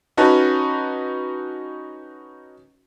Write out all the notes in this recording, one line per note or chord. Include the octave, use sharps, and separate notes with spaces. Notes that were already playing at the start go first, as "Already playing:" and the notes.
C#4 D#4 F#4 B4 A5